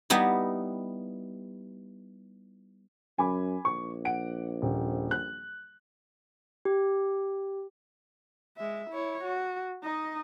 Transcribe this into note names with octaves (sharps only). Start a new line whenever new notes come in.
G3 B3 D#4 E4
F#2 G#5 B5 D6
A#1 C#6
F#5 D7
D#1
F#6
G4
G#3 E5
E4 C#5
F#4
D#4 D#5